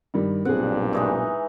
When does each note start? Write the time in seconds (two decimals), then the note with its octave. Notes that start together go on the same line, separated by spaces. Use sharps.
0.14 G2 D#3 G3
0.45 B1 G2 A#2 C4 G#4 F#5
0.93 E3 G#3 D#4